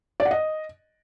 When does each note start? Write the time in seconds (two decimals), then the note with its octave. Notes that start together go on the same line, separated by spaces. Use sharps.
0.20 D5
0.25 F#5
0.31 D#5